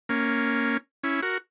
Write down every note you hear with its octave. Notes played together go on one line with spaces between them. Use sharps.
A#3 C#4
C#4 E4
F#4 A#4